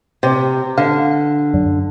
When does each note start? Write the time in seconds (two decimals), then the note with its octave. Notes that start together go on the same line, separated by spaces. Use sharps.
0.23 C3
0.78 D3 F5
1.54 F#2